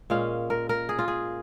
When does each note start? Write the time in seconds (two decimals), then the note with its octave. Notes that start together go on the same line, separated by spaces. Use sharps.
0.10 A#2 G#3 C#4 F5
0.50 A#4
0.69 A#4
0.89 G#4
0.99 F4
1.08 G#4